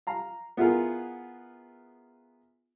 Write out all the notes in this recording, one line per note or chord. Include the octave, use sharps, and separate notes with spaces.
F5 A#5
B3 E4 F4 G#4 A#4